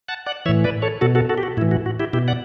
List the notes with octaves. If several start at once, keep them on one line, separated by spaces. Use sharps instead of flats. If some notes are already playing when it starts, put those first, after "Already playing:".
F#5 A5
D5 F#5
A2 E3 C#5 E5
B4 D5
A4 C#5
B2 F#4 A4
F#4 A4
F#4 A4
G4
F#4
A2 E3 E4
F#4
F#4
E4 G4
B2 E4 G4
D5 F#5